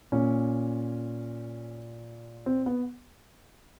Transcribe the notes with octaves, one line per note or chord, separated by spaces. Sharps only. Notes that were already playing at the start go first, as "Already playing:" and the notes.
A#2 C#4
C4
B3